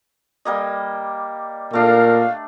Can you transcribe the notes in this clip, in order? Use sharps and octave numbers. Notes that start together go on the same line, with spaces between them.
G3 A#3 D#5
A#2 A3 D4 A#4 F5